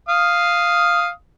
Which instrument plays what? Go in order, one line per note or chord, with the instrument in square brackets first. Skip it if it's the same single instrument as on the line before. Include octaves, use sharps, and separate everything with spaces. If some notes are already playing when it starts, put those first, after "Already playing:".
[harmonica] F5 D#6